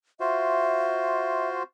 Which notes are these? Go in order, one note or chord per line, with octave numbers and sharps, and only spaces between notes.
F4 F#4 C5 E5